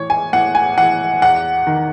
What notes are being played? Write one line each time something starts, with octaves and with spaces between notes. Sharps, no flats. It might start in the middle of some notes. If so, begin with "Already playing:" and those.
Already playing: A2 E3 C#5
G#5
A2 F#5
G#5
E3 F#5
E2 F#5
D#3